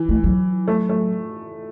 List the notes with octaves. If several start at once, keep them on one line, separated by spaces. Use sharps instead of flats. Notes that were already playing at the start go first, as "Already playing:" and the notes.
Already playing: E3
A3
F#3
A3
A3